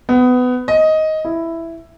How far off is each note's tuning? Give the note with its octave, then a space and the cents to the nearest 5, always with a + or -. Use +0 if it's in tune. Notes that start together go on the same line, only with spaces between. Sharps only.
B3 +20
D#5 +10
E4 +5